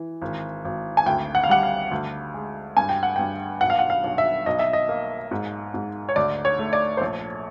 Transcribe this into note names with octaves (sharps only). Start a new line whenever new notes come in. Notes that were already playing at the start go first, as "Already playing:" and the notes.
Already playing: E3
G#1
G#1
G#5
D2 G5
F#5
F5
G3 F#5
F5
D2
G#3
G2 G#5
G5
F#5
G2 G5
B1 F#5
F5
F#5
F5
B1
E5
B1 D#5
E5
D#5
A#3
G#2
G#2
C#5
D2 D5
C#5
A3
D5
C5
A#1 C#5